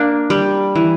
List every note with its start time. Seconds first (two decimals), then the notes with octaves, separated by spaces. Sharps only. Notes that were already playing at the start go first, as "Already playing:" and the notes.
Already playing: A#3 D4
0.30 G3
0.75 E3